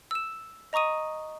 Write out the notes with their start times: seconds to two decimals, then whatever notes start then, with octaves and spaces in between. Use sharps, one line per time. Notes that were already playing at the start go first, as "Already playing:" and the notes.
0.11 E6 E7
0.73 D#5 A#5 C#6 D#6 D#7